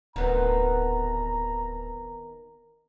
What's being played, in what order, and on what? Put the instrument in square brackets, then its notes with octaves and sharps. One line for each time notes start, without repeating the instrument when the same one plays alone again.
[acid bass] D1 [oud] D#3 B3 C4 [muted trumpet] A#5